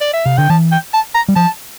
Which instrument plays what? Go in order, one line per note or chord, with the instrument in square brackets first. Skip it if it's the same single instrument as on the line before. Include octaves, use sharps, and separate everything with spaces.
[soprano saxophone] D5
E5
[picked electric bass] C3 [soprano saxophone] F5
[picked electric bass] D3 [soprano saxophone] G5
[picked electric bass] E3 [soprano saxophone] A5
[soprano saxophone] G5
A5
A#5
[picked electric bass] G3
[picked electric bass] F3 [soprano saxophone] A5